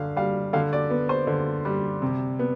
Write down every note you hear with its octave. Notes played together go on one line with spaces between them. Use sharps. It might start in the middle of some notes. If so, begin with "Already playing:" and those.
Already playing: D3 F5
G3 F5
D3 F5
D5
B3
C5
D3
G3
C3
B3